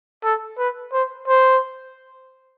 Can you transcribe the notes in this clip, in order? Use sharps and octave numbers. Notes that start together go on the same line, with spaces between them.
A4
B4
C5
C5